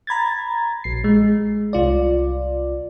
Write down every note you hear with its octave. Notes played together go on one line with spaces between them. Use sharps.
A#5 B5 G#6 A6
A#1 C7
G#3
C2 F4 D5